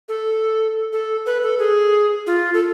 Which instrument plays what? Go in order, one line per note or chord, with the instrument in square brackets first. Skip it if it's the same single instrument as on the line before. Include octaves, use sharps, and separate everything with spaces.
[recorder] A4
A4
B4
A4
G#4
F4
A4